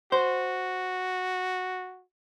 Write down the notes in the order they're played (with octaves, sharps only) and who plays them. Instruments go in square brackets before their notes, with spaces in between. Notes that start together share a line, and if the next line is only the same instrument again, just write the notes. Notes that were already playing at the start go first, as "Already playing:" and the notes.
[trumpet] F#4 [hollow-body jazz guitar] C5